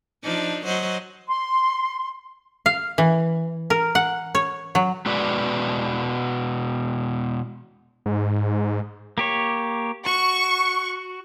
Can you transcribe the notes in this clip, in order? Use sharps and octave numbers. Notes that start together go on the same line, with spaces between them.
F3 D4 D#4
F#3 C5 D#5
C6
F5
E3
A#4
F#5
C#5
F#3
B2 G#3 F#4 B4 D5
G#2
A#3 G4 C#5
F#4 C#6